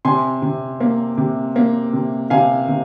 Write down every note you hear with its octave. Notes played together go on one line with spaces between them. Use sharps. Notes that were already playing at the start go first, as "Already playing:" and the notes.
C3 G#5 C6
C3
A#3
C3
A#3
C3
C3 F5 G#5
C3